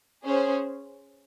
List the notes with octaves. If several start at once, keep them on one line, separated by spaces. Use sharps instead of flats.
C#4 G#4 C5